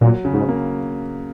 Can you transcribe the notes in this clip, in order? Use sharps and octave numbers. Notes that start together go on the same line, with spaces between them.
A#2 F#3
C#3
G#2
A#3